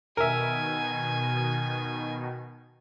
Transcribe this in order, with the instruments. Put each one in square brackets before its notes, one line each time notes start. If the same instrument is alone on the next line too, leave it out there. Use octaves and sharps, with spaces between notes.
[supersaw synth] B2 D#3 [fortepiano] A#4 E5 [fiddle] G#5